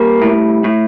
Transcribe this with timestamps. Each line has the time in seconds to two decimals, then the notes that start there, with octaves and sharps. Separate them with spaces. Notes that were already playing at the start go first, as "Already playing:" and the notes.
Already playing: G3 A#3
0.22 A2
0.64 A2